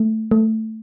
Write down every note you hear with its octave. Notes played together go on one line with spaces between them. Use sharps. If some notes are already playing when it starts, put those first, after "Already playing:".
Already playing: A3
A3